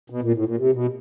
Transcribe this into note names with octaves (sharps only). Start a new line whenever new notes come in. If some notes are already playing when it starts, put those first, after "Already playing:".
B2
A#2
A2
A#2
C3
B2